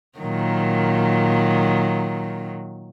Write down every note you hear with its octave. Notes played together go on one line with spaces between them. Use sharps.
A#2 D#3 F#3